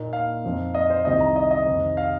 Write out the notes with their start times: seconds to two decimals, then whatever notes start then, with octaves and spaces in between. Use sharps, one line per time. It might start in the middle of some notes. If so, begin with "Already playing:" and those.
Already playing: A#2 A#3 D#4
0.13 F5
0.44 F2 F3 C4 D#4
0.75 D#5
0.90 C5
1.05 C2 C3 D#3 C4 D#5
1.20 A#5
1.36 D#5
1.51 D#5
1.66 F2 C3 D#3
1.97 F5